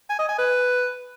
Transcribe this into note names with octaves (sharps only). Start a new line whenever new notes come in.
G#5
D#5
G#5
B4